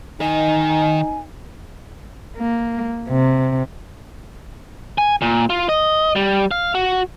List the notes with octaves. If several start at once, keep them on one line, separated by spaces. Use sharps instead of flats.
D#3 D#4 D#5 G#5
A#3
C3
G#5
A#2
F4
D#5
G3
F5
F#4